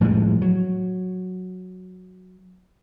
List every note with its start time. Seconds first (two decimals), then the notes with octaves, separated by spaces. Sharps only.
0.01 A2 F3 G3 G#3
0.42 F#3